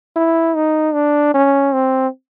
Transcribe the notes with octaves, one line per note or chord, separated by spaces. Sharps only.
E4
D#4
D4
C#4
C4